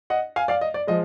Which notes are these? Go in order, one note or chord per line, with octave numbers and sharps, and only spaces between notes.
D#5 F#5
F5 G#5
D5 F5
D#5
D5
F3 G#3 D#5